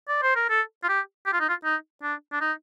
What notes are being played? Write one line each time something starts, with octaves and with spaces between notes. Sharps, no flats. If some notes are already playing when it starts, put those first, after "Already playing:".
D5
C5
A#4
A4
F4
G4
G4
F4
D#4
F4
D#4
D4
D4
D#4